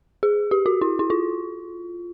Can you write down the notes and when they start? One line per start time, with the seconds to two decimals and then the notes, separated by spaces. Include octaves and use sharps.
0.23 G#4
0.51 G4
0.66 F#4
0.81 E4
0.99 E4
1.10 F4